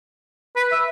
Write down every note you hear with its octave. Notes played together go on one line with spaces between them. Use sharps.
B4
E5